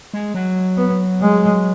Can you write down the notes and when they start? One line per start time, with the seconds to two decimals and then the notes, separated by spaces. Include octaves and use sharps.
0.14 G#3
0.34 F#3
0.77 B3
1.21 G#3